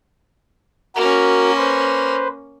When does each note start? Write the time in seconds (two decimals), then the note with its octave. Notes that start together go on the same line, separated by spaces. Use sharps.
0.96 A#3 C#4 F#4 A#4
1.57 B4 C5